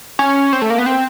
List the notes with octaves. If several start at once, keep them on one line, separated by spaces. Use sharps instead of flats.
C#4
C4
A3
A#3
B3
C4